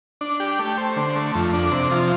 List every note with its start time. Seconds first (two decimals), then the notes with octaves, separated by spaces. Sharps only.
0.21 D4
0.40 G4
0.59 A3
0.78 C5
0.96 D3
1.16 A3
1.35 F2
1.53 D4
1.72 C3
1.91 F3